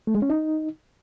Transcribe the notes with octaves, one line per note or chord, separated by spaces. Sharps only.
A3
G#3
C#4
D#4